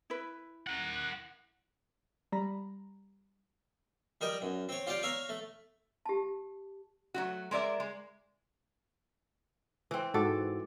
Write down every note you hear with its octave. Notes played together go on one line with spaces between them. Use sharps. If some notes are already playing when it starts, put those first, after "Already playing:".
E4 B4
A#4 F#5 F#6
G3 A#5 B5
G3 A#4 D#5 G5
F#2
C4 C#5
F4 G4 D5 F5 G5
C#5 E5 F5 A#5
A3
G4 A5
F#3 A3 F#4
G#3 A#4 D5 E5
G#3
E3 C4
G#2 F#4 A4 D6